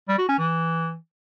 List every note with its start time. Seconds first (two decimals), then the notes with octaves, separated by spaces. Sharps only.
0.08 G3
0.18 F#4
0.28 C#4
0.38 E3